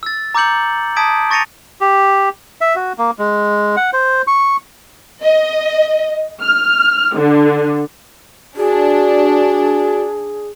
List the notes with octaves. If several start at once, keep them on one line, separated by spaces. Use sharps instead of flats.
E6 A6
A#5 D6 E6 G6 C#7 F#7
A5 D#6 G#6 B6 D7
C#6 A6 A#6 C#7 D#7 F7
G4
E5
F#4
A#3
G#3
F#5
C5
C#6
D#5
F6
D3
D4 F#4 G#4